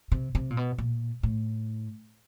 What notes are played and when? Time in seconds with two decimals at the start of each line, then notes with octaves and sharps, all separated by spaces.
0.12 C3
0.35 C3
0.50 A#2
0.57 B2
0.78 A#2
1.23 A2